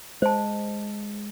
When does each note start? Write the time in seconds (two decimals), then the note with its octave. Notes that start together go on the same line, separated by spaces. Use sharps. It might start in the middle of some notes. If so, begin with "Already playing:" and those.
0.22 G#3 C5 A5